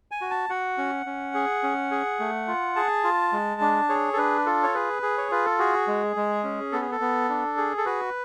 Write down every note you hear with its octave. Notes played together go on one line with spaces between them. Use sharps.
G#5
F#4
A5
F#4 F#5
C#4
C#4
G#4
C#4
G#4
A3
F4
G#4 A5
F4
G#3
D4
G#4 C#5
A4
D4 B4
F4 A4
C#5
G#4 B4
G#4
C#5
F4 B4
A4
F#4 G#4
G#3
G#3
C#4
B3 A4
G#4
A4
B3
D4
G#4
A4
F#4 B4